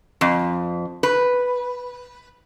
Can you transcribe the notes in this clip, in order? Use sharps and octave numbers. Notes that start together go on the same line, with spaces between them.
F2
B4